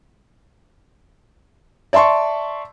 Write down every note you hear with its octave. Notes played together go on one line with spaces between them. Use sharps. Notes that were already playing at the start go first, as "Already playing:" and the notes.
D5 E5 A5 C6 C#6